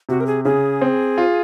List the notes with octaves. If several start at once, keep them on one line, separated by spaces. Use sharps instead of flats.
C3 F#4
A#4
G#4
C#3 G#4
C4
F4